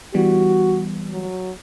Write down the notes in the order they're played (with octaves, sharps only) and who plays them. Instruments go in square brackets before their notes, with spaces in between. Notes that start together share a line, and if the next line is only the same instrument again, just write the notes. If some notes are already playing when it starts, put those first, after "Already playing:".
[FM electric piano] E3 G3 B3 [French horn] F#4
[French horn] F#3